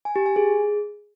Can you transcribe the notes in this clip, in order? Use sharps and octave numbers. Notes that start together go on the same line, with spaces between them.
G#5
G4
G#5
G#4